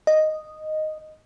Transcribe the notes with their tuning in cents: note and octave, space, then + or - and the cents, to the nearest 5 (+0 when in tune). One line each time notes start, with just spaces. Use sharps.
D#5 -5